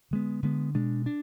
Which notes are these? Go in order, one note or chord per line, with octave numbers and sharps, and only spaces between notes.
D3 G#3 B3
D3 G#3 B3
B2 G#3 D4
D4